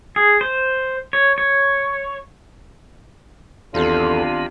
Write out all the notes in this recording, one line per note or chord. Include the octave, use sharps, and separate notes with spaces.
G#4
C5
C#5
C#5
B1 E2 C3 D#3 B3 D4 F4 A4